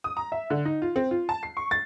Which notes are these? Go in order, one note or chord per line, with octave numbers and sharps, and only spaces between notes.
D#6
A#5
E5
D3
D#4
F4
C4
F4
A5
C7
C#6
A6